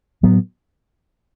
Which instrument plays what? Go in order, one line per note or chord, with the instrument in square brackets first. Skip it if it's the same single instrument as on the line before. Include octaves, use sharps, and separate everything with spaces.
[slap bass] A2 F#3 B3